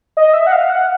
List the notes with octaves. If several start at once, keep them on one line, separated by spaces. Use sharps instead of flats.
D#5
E5
F#5
F5
F#5